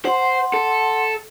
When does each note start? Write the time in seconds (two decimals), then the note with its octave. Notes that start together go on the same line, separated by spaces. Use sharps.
0.05 C5 F#5 C6
0.54 A4